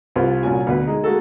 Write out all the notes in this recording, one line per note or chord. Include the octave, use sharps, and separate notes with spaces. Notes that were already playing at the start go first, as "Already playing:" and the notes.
C2 F4 G4 B4 C5 C6
C2 A#2 C#4 F#4 G#5
D2 B2 B4
G#3 D#4
G#3 A#3 F#4 A4